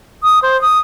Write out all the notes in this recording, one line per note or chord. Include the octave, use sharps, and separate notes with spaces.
D#6
C5
D#6